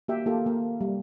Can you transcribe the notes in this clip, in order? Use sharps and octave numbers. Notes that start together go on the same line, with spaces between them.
A#3 F#4 G4 E5 G5
A#3 F4 G4 A4
A#3 A#4
G3